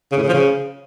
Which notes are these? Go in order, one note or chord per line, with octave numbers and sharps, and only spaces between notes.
C#3
A2
C#3
F3
C#3